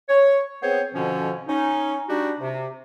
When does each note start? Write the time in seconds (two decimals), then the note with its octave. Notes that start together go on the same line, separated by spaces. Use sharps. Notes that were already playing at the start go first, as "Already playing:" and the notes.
0.09 C#5
0.62 B3 C4 G#4 C5 C#5
0.94 F2 B2 D3 F3 C#4
1.48 C#4 D#4
2.09 G3 D4 D#4 F#4 G4
2.40 C3